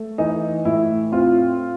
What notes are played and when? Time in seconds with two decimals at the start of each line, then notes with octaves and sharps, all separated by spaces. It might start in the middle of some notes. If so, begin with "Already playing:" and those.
Already playing: A3
0.18 E3 D#4
0.65 A2 E4
1.12 C4 F4